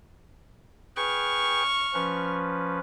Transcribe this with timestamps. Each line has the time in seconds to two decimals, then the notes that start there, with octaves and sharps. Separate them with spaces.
0.96 G#4 B4 G5 C#6 F6
1.94 F3 C#4 B4